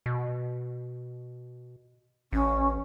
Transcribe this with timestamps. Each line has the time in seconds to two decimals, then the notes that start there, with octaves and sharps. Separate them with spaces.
0.06 B2
2.33 A1 C#4